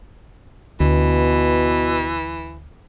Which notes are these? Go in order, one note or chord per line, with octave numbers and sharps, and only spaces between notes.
D2 B2 E3